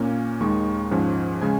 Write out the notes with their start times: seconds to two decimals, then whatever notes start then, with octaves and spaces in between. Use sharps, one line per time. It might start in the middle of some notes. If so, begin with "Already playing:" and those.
Already playing: A#2 A#3 C#4
0.40 D#2 D#3 G#3 C#6
0.91 G#2 F3 C#4
1.41 C#3 G#3 C#4 G#5